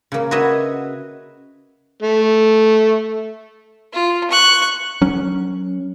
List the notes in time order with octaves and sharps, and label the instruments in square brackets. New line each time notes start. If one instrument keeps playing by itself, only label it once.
[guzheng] C#3 A#3
F#4 B4 C#5 D#5 E5
[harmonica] A3
[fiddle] F4
C#6 F#6
[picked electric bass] F#3 C#4